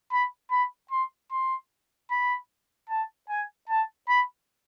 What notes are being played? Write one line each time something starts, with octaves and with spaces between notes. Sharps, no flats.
B5
B5
C6
C6
B5
A5
G#5
A5
B5